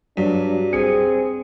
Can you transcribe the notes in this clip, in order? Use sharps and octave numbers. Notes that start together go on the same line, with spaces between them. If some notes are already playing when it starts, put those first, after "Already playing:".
G2 F#3 D4
C4 G#4 C#7